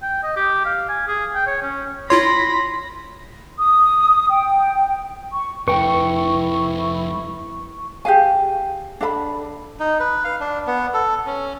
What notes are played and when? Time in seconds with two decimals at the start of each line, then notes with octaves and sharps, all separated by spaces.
0.02 G5
0.23 D#5
0.36 G4
0.65 F5
0.89 G#5
1.07 G#4
1.35 G5
1.47 C#5
1.62 C#4
2.10 E4 F4 C#5 B5 C6 A#6
3.59 D#6
4.29 G5
5.32 C#6
5.68 F2 A3 E4 B4 G5 C#6
8.05 G4 G#4 F5 G#5
9.01 D4 A4 E5 B5
9.80 D#4
10.00 B4
10.24 F5
10.40 D4
10.67 B3
10.94 A4
11.26 C#4